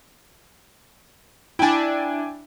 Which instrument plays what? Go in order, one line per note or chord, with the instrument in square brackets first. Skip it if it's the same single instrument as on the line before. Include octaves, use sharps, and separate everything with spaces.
[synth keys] D4 E4 [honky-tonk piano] G5 G#5